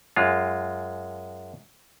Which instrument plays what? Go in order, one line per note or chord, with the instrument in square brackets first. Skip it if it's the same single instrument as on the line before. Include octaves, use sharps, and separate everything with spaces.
[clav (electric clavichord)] F#2 G#3 F4